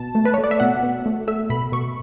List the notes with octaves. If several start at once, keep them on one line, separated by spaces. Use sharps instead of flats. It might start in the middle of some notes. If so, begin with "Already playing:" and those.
Already playing: B2 A5
A3
B4
C#5
A3
D5
E5
B2 F#5
B2
A3
A3 E5
B2 B5
B2 C#6